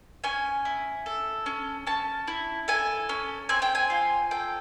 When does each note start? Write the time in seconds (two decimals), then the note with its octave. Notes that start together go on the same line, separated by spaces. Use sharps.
0.24 C#4 G#5
0.65 E4
1.06 A4
1.46 C#4
1.87 C#4 A5
2.28 E4
2.68 A4 G#5
3.09 C#4
3.49 C4 G#5
3.62 G5
3.75 G#5
3.90 F4
4.31 A4 G5